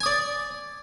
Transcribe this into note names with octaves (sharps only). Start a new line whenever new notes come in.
D5 G#5 D#6